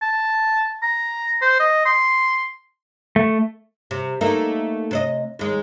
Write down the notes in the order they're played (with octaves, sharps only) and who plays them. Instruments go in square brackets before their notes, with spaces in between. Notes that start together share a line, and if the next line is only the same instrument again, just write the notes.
[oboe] A5
A#5
C5
D#5
C6
[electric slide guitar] A3
[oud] C3
A3 A#3 D#4
C3 C5 D#5
D#2 G#3